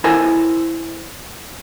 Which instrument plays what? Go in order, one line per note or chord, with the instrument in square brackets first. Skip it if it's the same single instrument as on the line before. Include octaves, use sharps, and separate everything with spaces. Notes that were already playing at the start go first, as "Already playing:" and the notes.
[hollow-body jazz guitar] E4 A4 A#4 C5 G#5